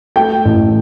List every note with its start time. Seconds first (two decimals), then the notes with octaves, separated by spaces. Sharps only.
0.16 A3 G5
0.45 A1